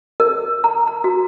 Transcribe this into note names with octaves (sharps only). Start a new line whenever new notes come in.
A#4
A#5
A#5
F#4